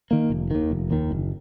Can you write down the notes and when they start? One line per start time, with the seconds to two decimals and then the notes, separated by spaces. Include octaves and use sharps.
0.11 D#3 A#3
0.30 F1
0.51 D#2 D#3
0.71 F1
0.91 D#2 D#3
1.11 F#1